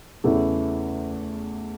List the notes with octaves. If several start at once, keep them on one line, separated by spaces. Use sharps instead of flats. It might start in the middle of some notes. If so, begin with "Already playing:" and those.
E2 C#3 E3 A3